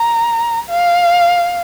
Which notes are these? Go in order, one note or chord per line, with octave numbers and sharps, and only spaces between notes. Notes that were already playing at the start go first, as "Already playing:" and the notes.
Already playing: A#5
F5